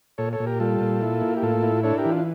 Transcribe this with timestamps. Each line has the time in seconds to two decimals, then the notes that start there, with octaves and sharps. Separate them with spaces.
0.18 A#2 A4 C#5
0.33 A4 C#5
0.40 A#2
0.46 G4 A#4
0.60 G3 F4 A4
0.81 A#2
1.01 E4
1.21 A#3
1.37 G4
1.42 A2 F4 A4
1.63 E4
1.83 D4 A4 C#5
1.98 G4 A#4
2.05 E3
2.12 F4